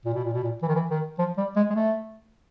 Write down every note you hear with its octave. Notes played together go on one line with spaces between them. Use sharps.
A#2
B2
A#2
B2
A#2
E3
D#3
E3
D#3
F3
G3
G#3
G#3
A3